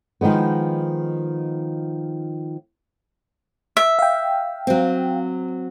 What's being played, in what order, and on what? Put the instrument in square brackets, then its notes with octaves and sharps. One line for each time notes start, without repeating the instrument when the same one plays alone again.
[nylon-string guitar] D#3 F3 G#3 B3
[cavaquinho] E5
[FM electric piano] F5 G5
[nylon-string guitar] F#3 C4